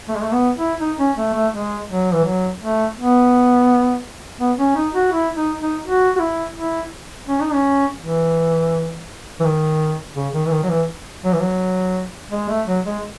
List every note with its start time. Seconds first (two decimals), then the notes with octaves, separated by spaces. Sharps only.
0.09 A3
0.16 G#3
0.23 A3
0.33 B3
0.57 E4
0.80 D#4
0.98 C#4
1.17 A3
1.34 A3
1.53 G#3
1.88 F#3
2.13 E3
2.24 F#3
2.60 A3
2.97 B3
4.40 B3
4.58 C#4
4.76 D#4
4.95 F#4
5.12 E4
5.36 D#4
5.60 D#4
5.85 F#4
6.16 F#4
6.20 E4
6.56 E4
7.28 C#4
7.41 D#4
7.53 C#4
8.00 E3
9.40 E3
9.44 D#3
10.15 C#3
10.34 D#3
10.46 E3
10.51 D#3
10.63 F#3
10.69 E3
11.24 F#3
11.33 E3
11.41 F#3
12.32 G#3
12.49 A3
12.67 F#3
12.86 G#3